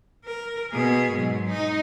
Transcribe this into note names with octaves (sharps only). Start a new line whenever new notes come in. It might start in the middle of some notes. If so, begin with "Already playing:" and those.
A#4
B2 G#4
G#2 F#3
D#4